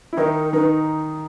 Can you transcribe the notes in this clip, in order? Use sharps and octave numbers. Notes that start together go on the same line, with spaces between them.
E4
D#3 D#4 A#4 B4
D#3 D#4 B4